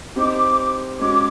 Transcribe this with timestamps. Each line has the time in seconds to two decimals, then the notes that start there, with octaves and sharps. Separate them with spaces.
0.16 G3 C4 D#4 D6
0.99 G#3 C#4 F#4 D6